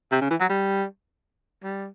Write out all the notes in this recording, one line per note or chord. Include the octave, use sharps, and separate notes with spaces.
C3
C#3
E3
F#3
G3
G3